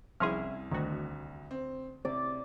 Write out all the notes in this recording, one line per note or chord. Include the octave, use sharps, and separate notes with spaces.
C2 F3 C#4 E4 G#4 C6 F6
D2 D#3 F#4
C4
C3 D5